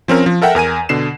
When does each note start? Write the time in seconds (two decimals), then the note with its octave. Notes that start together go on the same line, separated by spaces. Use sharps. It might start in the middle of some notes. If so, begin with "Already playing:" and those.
0.08 F3 C4 C#4 A#4
0.26 F3
0.42 A4 A#4 E5 F#5 G5
0.55 E2 A#4 G#5 D#7
0.89 B2 D3 C7 E7